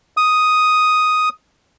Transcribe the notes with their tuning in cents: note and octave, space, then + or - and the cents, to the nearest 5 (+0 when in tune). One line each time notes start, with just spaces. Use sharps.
D#6 +5